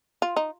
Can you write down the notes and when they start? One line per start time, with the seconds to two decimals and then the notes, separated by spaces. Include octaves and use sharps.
0.22 F4
0.37 D#4